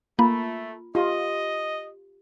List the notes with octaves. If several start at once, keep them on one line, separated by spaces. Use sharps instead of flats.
A3 A#3 F4
F4 G4 D#5